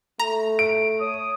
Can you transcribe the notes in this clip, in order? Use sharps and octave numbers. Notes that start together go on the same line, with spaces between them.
A3 A#5
D7
C#5 D#6